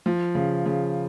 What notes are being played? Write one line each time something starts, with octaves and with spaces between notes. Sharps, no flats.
F3
C#3
C#3